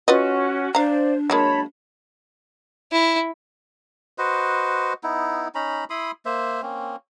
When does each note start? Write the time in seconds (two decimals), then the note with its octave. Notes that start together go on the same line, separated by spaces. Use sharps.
0.08 C#4 F4 F#4 B4 D#5
0.75 D4 C5 D5 F5 A#5
1.30 F#3 G#3 A#3 C#5 A5 B5
2.93 E4
4.18 F#4 B4 C5 D#5
5.03 B3 D#4 E4
5.55 C#4 D#4 A#5 B5
5.90 E4 B5 C6 D#6
6.25 A#3 C5 E5
6.62 A#3 C4 C#4